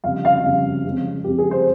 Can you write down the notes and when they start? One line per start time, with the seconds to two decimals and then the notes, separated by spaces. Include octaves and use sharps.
0.04 F2 C#3 G3 F5
0.25 F5
0.44 F2 C#3 G3
0.85 F2 C#3 G#3 C4
1.24 F2 C#3 G#3 C4 G4
1.38 G#4
1.51 C5